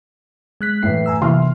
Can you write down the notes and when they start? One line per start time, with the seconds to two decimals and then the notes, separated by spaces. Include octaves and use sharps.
0.61 G#3 F#6 B6
0.83 F#2 A2 E3 C7
1.06 G#5 A#5 E6
1.21 C3 E3 A#3 E5 C6 F6